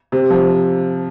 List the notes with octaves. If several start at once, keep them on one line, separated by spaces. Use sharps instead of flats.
C3
F3